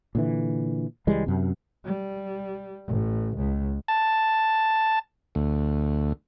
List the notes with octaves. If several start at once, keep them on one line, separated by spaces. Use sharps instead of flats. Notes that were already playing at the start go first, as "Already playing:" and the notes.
A#2 D3 E3
C#2 E3 G3 G#3
F#2 C3
G3
A1
C#2
A5
D2